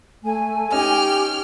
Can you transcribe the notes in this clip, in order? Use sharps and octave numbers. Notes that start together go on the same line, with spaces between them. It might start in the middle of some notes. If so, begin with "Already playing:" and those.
A3 G#5
C#4 D#4 G4 G5 F6